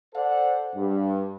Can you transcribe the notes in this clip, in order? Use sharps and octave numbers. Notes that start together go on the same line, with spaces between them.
A4 C5 D5 F#5
G2